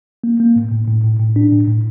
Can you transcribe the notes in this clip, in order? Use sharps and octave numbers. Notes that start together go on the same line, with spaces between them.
A#3
A#3
A2
A2
A2
A2
A2
D4
A2
A2